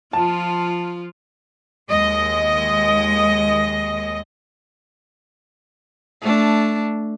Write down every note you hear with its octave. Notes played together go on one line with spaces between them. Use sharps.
F3 F4 A5
D#2 G#3 D#5
A3 D4